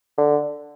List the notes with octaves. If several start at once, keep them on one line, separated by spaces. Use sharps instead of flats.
D3